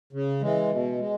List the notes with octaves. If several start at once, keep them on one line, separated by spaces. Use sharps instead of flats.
C#3
E3 G#3
B2
G#3